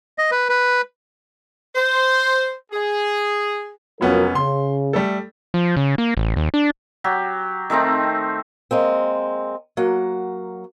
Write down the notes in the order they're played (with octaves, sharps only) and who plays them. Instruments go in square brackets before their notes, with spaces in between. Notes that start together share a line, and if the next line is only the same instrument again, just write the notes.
[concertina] D#5
B4
B4
[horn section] C5
G#4
[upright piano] F1 B3 C#4 [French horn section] F#3 F4 A#4
[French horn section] C#3 [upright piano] C6
[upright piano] G3 A3 A4
[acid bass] F3
C#3
A#3
A1
D#2
D4
[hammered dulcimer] F#3 G4
D#3 A3 C4 D#4
[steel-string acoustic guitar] G#3 A#3 C4
F#3 A#3 F#5